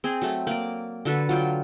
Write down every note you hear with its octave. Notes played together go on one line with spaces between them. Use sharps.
C4 G#4
F#3 A3
A#3 D5
D3 F#4 A4 B4
F#3 F4 G5